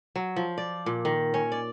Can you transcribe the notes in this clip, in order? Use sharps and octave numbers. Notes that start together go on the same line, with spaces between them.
F#3
F3
D5
A#2
D#3
C#4
D5